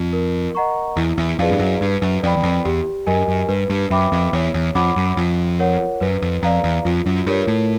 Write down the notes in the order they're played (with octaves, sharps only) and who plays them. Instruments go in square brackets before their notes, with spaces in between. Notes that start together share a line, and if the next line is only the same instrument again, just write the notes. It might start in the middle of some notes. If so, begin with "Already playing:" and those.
Already playing: [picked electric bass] F2
[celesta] A#4
D#5 F#5 A#5 C#6
[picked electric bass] E2 [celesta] E4
[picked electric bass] E2
[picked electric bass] F2 [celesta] G#4 B4 D5 F5
[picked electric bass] G2
F#2
[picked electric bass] G2 [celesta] B4
[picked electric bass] F#2
[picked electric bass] F2 [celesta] D5 G5 B5
[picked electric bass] E2
F2
[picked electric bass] E2 [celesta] G4
[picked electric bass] F#2 [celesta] A#4 D#5 G#5
[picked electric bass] F#2
[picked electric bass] G2 [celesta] B4
[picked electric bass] G2
[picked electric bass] F#2 [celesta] E5 G5 B5 D6
[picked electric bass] F2
[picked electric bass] E2 [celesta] C#5
[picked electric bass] E2
[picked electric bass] F2 [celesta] F#5 B5 D6
[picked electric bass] F#2
[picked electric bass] F2 [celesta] F4
[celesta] A#4 C#5 F#5
[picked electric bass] F#2 [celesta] B4
[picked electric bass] F2
[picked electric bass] F2 [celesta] D5 F5 A#5
[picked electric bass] E2
[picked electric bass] F2 [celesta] F4
[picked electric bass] F#2
[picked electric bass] G2 [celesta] A#4 C#5
[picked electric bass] A2